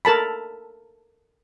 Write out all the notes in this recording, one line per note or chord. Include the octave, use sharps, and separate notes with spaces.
A4 A#4 A5 B5